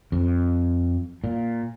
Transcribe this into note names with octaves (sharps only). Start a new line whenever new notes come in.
F2
A#2